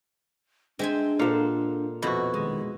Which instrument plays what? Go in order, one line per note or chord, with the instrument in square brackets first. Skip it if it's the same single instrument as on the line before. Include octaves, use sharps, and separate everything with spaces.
[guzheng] G#3 E5 G#5 [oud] C4 [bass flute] D4
[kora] A#2 F5 F#5 [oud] A4 C5
[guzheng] F2 B2 [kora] E4 F#4
[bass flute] D#3 [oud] G#3